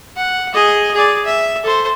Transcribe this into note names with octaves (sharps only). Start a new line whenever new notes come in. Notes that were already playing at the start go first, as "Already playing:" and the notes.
F#5
G#4 D#5
G#4 D5
E5
A4 C5